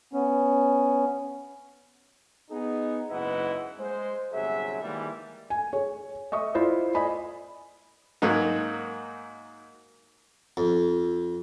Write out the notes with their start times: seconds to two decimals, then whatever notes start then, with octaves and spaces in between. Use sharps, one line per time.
0.13 B3 C#4
2.50 B3 D#4 G#4
3.09 F#1 G#2 E4 B4 D#5 F#5
3.79 G#3 C5
4.32 G1 C3 F#3 G#4 E5
4.82 D#3 E3 G3 G#3 A#3
5.50 G#5
5.73 G#4 C#5
6.32 D#5 E5 C#6 D#6
6.55 E4 F4 C5 D5 D#5
6.95 D5 D#5 G#5 B5
8.22 G#2 F#3 A#3 D#4
10.57 F2